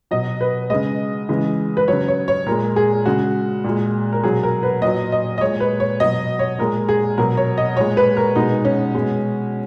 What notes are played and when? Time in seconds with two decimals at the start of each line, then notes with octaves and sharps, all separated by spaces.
0.11 B2 F#3 D#5
0.41 B4
0.70 C#3 G#3 D#5
1.29 C#3 E3 G#3
1.77 B4
1.88 C#3 F#3 C#5
2.08 C#5
2.28 C#5
2.46 A#2 G#3 A#4
2.76 G#4
3.06 C#3 G#3 F#4
3.64 A#2 G#3
4.13 A#4
4.24 B2 F#3 G#4
4.43 A#4
4.63 B4
4.82 A#2 F#3 D#5
5.12 D#5
5.38 D#5
5.41 A#2 G#3 C#5
5.60 B4
5.80 C#5
6.00 B2 F#3 D#5
6.39 C#5
6.59 A#2 G#3 A#4
6.89 G#4
7.18 B2 F#3 A#4
7.37 C#5
7.58 D#5
7.77 A#2 G#3 C#5
7.97 B4
8.17 A#4
8.36 B2 G#3 D#4
8.65 C#4
8.95 B2 G#3